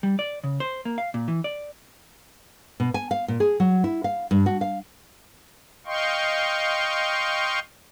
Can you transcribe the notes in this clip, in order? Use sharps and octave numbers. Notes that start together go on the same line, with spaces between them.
G3
D5
C#3
C5
A#3
F5
A#2
E3
D5
B2
G#5
F5
A#2
G#4
F#3
E4
F5
G2
F#4
F5
D#5 F5 G5 C6 C#6